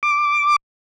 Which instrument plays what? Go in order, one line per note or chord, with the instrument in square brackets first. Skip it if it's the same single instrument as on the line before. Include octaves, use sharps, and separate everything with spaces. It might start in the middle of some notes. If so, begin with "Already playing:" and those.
[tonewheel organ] D6